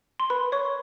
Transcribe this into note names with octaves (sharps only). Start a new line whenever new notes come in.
C6
A#4 B4 B5
A#4 C#5 C#6